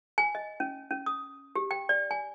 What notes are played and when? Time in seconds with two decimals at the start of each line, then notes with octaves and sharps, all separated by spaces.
0.18 G#5
0.35 D#5
0.60 C#4
0.91 C#4
1.06 D#6
1.56 G4
1.71 G5
1.89 D5
2.11 G#5